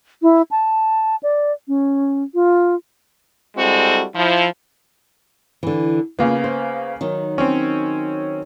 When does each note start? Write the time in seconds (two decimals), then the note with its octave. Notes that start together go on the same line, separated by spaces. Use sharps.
0.22 E4
0.51 A5
1.23 D5
1.68 C#4
2.34 F4
3.57 G3 G#3 C4 E4 F#4 A4
4.15 F3 E4
5.63 D3 E3
6.19 C#3 A#3 B3 F4
6.44 C5
7.01 D#3 F#3 D#4
7.38 C4 C#4